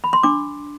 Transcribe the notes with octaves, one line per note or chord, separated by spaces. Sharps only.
B5
C6
D4 D6